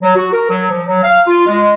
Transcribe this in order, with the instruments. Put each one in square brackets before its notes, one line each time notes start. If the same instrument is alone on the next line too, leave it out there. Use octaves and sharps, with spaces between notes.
[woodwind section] F#3
F#4
A#4
F#3
F3
F#3
F5
F4
G#3